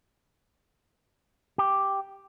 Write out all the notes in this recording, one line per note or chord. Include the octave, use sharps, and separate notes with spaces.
G4